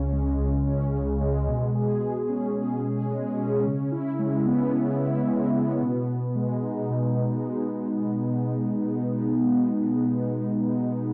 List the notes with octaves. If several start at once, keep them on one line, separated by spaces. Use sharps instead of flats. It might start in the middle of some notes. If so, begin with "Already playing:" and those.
Already playing: C#2 C#3 C#4
G#3
C#2
C#4
C#3
G#3
B2
G#4
G#3
C#4
B2
G#4
G#3
C#4
C#3
E4
G#3
B3
C#3
E4
G#3
B3
B2
B2
G#3
D#4
B2
B2
G#3